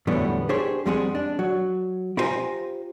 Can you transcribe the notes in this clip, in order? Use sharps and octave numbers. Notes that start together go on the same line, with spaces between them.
E2 A2 D3 F#3 G3 B3
D4 G4 G#4 C5 C#5
F2 G3 G#3 C4 G#4 F#5
D4
F#3
E4 F4 G4 C5 G#5 A#5